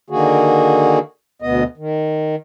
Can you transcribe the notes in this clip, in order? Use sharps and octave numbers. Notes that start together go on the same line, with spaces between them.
D3 D#3 A#3 F#4 G#4
D2 B2 B3 D#5
D#3